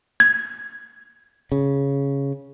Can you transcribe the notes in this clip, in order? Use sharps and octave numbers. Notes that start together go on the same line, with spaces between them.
G#6
C#3